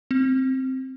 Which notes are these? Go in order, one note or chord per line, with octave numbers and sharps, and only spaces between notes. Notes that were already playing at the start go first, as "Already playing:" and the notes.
C4